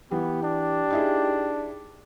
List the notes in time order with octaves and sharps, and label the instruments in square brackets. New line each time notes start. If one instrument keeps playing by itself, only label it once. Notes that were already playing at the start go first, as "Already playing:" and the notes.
[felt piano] E3 [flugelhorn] B3 [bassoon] G4
[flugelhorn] D4
[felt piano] D#4 E4 G#4